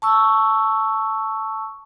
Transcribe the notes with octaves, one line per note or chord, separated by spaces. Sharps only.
A5 C#6 E6